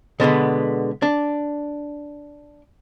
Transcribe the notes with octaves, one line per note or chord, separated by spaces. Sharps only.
B2 D3 G#3 B3
D4